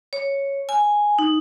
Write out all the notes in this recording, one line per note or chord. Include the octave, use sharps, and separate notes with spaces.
C#5
G#5
D#4